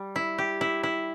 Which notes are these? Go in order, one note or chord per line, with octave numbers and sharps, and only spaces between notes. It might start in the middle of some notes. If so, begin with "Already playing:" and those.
Already playing: G3
E4
G4
E4
E4